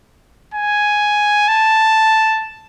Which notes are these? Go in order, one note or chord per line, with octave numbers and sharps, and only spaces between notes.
G#5
A5